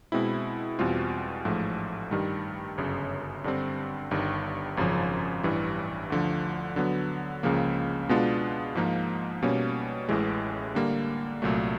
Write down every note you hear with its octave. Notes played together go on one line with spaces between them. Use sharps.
B2 G#3 C4 E4
E2 B2 G3 C4 F4
A1 G#2 F3 A3
G2 D#3 G3
G1 F#2 C#3
G2 D3 G3 C4
G1 G2 D#3
G#1 F#2 C#3 F3
A1 G2 E3 G3
D2 D3 F3
D3 F#3 B3
C#2 C#3 F3 A#3
B2 G#3 B3 D4 F4
G#2 F3 A#3 D#4
B2 G3 A#3 C#4
A1 A2 E3 G#3
D3 G3 A#3
C2 A#2 F#3 A3